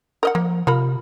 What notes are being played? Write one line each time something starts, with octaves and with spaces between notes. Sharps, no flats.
A#4 D#5 F#5
F3 A#3
C3 F4 A#4 B5